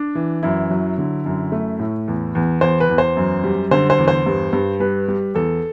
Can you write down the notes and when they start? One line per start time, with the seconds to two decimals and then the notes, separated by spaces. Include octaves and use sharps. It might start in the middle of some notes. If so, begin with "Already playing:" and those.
Already playing: D4
0.15 E3
0.43 F#2 E4
0.71 F#3
0.98 D3
1.26 F#2
1.52 A3
1.79 A2
2.08 E2
2.35 E2
2.61 E2 C5
2.80 B4
2.90 E2
2.98 C5
3.17 F#2
3.44 G3
3.71 D3 C5
3.90 C5
3.98 E2
4.08 C5
4.26 G2
4.53 G2
4.80 G3 B4
5.08 G3
5.35 E2 A4